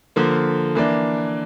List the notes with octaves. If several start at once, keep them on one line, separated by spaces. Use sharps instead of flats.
D3 F3 A#3
E3 A#3 D4